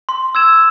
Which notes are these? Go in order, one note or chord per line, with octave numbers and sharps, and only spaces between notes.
C6
E6 G#6 E7